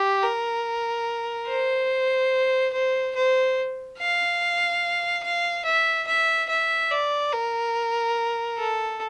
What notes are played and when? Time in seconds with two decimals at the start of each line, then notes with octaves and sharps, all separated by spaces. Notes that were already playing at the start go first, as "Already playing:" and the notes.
Already playing: G4
0.22 A#4
1.48 C5
2.73 C5
3.16 C5
3.99 F5
5.24 F5
5.65 E5
6.07 E5
6.49 E5
6.91 D5
7.32 A#4
8.58 A4